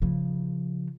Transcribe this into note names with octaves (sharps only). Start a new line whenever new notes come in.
C#3 F3